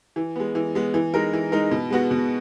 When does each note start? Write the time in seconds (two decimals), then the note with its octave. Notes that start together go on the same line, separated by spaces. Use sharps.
0.16 E3
0.36 G#3 B3
0.55 E3
0.75 G#3 B3
0.94 E3
1.14 G#3 D#4 A#4
1.33 E3
1.52 G#3 D#4 A#4
1.71 B2
1.90 G#3 B3 F#4
2.11 B2